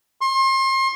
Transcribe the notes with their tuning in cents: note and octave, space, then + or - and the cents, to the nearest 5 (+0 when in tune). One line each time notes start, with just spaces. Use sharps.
C6 +35